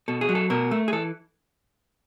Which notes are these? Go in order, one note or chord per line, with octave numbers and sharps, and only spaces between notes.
B2 A4
G#4
F#3
A4
B2 A#4
A3
G#4
E3 A4